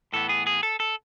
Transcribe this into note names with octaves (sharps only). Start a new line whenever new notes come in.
A2 E3 B3 A4
G#4
G#4
A4
A4